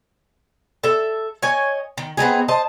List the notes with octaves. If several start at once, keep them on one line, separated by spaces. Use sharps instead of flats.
A4 E5
C#5 D#5 G#5
D#3
B3 C4 D#4 G#4
C5 D#5 A5